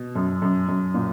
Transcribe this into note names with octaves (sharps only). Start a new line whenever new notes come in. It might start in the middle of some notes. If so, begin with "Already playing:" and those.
Already playing: B2
F#2
F#2
F#2
A#2